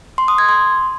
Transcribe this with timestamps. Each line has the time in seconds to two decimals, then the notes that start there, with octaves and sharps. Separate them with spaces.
0.18 C6
0.28 D#6
0.38 G#6
0.49 C6